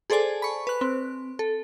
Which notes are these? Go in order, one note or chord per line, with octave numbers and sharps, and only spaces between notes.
G#4 A4 C5 D5 G#5 A5
B5 C#6
B4 F#6
C4
A4